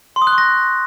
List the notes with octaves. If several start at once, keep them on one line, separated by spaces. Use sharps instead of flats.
C6
D#6
F#6
C#6
A#6